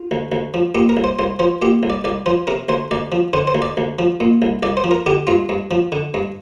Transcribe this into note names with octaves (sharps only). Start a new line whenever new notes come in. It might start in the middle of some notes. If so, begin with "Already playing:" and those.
Already playing: F4
D2
D2
F3
A#2 G4
A#4
C2
C5
C2 C5
F3 C5
A#2 G4
C2
D5
C2 D5
F3 C5
C3 A#4
D2 C5
D2 D5
F3
D3 C5
C5
D2
D5
D2
F3
A#2
C2
C2 D5
C5
F3
A#4
D3 G4
G2 F4
G2
F3
D3
G2